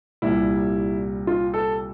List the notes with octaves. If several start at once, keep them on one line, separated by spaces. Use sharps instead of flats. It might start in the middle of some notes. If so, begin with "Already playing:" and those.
C2 A#2 G3 E4
F4
A4